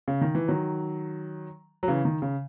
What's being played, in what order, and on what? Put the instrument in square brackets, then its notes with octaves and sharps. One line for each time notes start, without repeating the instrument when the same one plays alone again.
[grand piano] C#3
D#3
E3
D#3 F#3
F#3
C#3 E3
D#3
C#3